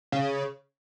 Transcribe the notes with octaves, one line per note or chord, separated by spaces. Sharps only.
C#3